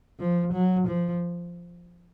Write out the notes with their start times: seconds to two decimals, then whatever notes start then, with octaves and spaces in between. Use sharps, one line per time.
0.19 F3
0.53 F#3
0.88 F3